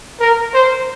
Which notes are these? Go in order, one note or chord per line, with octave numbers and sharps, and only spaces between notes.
A#4
C5